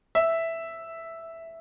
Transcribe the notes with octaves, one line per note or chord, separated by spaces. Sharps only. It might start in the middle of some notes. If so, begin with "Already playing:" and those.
E5